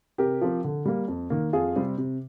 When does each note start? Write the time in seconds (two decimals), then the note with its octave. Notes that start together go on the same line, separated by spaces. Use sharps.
0.18 C3 G4 A#4
0.41 F3 C4
0.64 D3
0.86 G3 A#3
1.08 F2
1.30 D#3 A#3
1.53 F2 F4 G#4
1.76 C3 G3 C4
1.98 C3